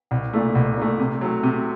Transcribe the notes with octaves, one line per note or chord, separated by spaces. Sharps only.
C2
A#2 A3
C2
A#2 A3
C3
F#3 A3
C3